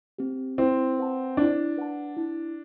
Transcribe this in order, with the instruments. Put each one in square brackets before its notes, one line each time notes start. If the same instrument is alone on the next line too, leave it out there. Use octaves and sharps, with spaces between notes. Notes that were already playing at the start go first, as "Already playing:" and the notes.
[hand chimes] C4 G4
[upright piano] C4 [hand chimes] E4
[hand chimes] B4 F#5 A5
[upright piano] D4 [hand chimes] E4
[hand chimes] B4 F#5 A5
E4